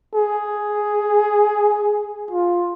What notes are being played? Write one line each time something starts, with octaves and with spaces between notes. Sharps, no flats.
G#4
F4